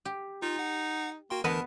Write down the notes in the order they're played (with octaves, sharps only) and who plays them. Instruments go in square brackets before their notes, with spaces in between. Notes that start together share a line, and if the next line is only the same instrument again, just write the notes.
[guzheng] G4
[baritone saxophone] D#4 [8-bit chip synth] F4
[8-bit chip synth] F#5
[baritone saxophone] A#3 [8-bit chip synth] F#4 G5 C6
[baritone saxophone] D2 [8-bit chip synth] E3 A#4 A5 [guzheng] B3 B4 D#5